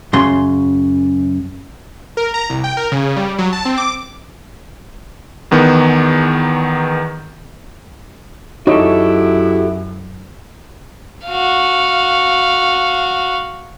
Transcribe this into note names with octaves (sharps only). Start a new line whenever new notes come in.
F#2 C#3 C6
A#4
A#5
C2
G5
A#4
C#3
G3
F#3
A5
C4
D6
E2 D#3 B3
F#2 D#4 E4 F#4 G4 A4 C#5 D#5
F#4 F5